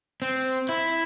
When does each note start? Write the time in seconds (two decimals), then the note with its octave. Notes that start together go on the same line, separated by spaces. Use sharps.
0.22 C4
0.69 E4